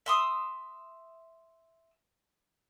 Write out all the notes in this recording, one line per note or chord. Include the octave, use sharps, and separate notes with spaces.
E5 C6 D#6